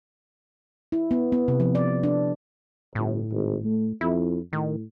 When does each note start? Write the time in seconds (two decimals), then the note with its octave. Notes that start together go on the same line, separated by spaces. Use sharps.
0.92 E4
1.11 B3
1.32 B3
1.48 C3
1.60 F3
1.75 D5
2.03 D4
2.95 G1 A2
3.31 G#1
3.64 A3
4.01 F2 E4
4.53 A2 D#3